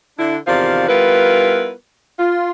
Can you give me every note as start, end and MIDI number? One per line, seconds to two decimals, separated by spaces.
0.18 0.37 50
0.18 0.37 62
0.18 0.37 64
0.47 0.88 40
0.47 0.88 48
0.47 0.88 51
0.47 0.88 53
0.47 0.88 74
0.47 0.88 77
0.89 1.72 55
0.89 1.72 59
0.89 1.72 64
0.89 1.72 65
0.89 1.72 70
0.89 1.72 71
2.19 2.50 65